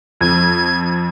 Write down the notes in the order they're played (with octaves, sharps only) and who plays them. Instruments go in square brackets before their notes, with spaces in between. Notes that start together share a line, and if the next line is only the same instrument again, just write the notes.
[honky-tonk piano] F2 [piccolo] G#6